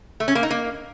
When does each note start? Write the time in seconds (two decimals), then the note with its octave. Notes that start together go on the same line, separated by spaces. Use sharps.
0.20 A3
0.28 C#4
0.35 A#3
0.43 D#4
0.50 A#3